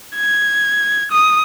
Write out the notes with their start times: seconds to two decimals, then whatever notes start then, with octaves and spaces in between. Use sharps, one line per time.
0.16 G#6
1.11 D#6